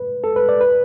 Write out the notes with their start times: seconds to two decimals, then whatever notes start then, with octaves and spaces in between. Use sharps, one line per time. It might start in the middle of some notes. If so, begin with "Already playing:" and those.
Already playing: B4
0.24 A4
0.36 B4
0.49 D5
0.61 B4